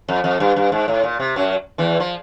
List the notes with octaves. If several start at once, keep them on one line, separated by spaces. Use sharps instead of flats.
F2
F2
G2
G2
G#2
A2
A#2
C3
F#2 F#3
E2 E3
F3